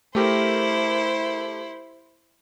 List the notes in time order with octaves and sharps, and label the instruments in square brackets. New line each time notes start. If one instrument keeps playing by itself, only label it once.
[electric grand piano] A3 G4 A#4 [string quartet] E4 C5